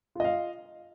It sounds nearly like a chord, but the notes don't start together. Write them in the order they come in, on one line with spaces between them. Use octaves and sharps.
F4 D#5 F5